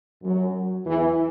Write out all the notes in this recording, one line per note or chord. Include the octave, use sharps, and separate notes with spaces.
F#2 F#3
E2 E3